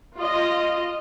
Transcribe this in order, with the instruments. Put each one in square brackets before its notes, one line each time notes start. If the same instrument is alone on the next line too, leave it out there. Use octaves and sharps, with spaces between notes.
[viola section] F4 D#5